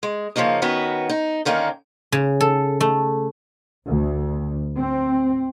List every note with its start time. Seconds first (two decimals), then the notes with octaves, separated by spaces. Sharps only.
0.03 G#3
0.36 C#3 F3 A#3 C#4 D#4
0.62 D#3 B3 C#4 F#4 B4
1.09 D#4
1.45 D3 D#3 A#3 C#4 D#4
2.12 C#3
2.41 A4
2.81 A3
3.86 D2
4.76 C4